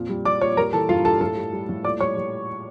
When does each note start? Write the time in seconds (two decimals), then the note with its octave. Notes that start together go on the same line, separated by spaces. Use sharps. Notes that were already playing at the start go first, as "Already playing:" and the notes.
Already playing: F2 A#2
0.09 G3
0.25 G3 D5 D6
0.41 A#2 C#5 C#6
0.57 G3 A#4 A#5
0.73 E3 A4 A5
0.89 G2 F4 F5
1.05 G2 A4 A5
1.21 A2 A4 A5
1.37 G3
1.53 G3
1.69 A2
1.84 A#2 D5 D6
2.00 G3 C#5 C#6
2.17 G3